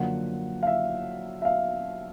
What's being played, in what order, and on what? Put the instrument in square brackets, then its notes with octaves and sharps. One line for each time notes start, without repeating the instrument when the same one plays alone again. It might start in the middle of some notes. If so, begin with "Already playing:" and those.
Already playing: [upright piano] F#2 D3 F3 A#3 F#5
F5
E5
E5
F5